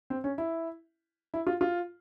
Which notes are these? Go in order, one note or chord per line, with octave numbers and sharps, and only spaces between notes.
C4
C#4
E4
E4
F4
F4